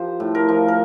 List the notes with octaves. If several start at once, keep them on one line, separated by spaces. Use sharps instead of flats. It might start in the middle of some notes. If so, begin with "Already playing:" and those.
Already playing: F3 G4 C5
A2
A#4
F3
A#4